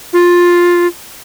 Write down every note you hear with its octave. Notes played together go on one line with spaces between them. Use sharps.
F4